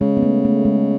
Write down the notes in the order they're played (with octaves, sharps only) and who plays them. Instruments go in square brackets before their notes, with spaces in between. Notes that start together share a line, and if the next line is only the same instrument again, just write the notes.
[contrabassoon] C#3 [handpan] G#3
[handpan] B3
A3
A3
G#3